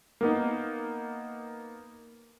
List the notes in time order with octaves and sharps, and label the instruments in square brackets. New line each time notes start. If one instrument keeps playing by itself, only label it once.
[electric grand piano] A#3 B3 D#4